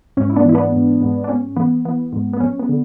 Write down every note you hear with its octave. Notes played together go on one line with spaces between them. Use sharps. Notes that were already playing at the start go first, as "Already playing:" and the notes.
G#2 C#4
E4
B3 D4
E3 E4
B3 D4
G#2
G#2
D4
G#2 C#4
E3 B3
E3 B3
G#2
B3
F#2 C#4
B3
D3